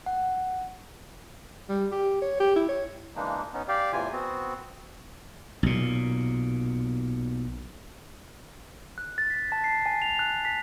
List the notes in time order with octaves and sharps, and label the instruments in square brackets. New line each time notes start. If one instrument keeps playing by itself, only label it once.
[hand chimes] F#5
[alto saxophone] G3
G4
C#5
G4
E4
C#5
[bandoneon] C#3 E3 G#3 A#3 D4 D#4
B3 C#4 D#4
G4 D5 F5 G5
E2 A2 C3 E3 F4 G#5
B3 C4 F#4
[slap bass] B1 A#2
[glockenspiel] F#6
A6
B6
A5
C7
G#5
F7
F#6
B6